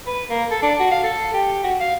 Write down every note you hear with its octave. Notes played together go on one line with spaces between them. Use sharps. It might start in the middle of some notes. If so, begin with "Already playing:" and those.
B4
A#3
A4
D4
F#4
F5
A4
G4
F#4
F5